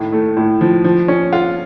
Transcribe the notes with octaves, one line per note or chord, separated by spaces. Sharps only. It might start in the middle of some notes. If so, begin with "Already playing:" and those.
Already playing: A2 D#3
A3
A2
F3
F3
C#4
F4